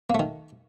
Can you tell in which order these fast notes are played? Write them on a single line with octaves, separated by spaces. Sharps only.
A#3 A3 D#3